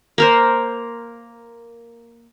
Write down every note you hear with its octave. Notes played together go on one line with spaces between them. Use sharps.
A#3 A#4 C5